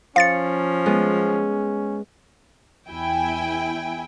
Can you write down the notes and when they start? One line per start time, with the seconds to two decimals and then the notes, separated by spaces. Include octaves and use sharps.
0.16 F3 C#4 F5 A6 C#7
0.86 G#3 B3
2.89 E2 E4 G5 G#5